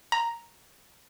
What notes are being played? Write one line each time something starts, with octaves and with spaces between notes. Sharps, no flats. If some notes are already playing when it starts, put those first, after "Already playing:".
A#5